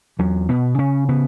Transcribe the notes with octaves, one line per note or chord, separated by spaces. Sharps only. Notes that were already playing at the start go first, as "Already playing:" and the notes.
E2 F#3
B2 B3
C#3 C#4
C#3 B3